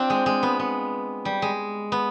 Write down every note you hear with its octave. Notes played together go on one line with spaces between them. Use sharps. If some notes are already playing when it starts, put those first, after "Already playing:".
Already playing: C4 D4 F4
G#3
G#3
B3
B3
G3
G#3
B3